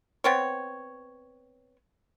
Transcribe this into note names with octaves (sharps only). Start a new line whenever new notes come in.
B3 C4 C#5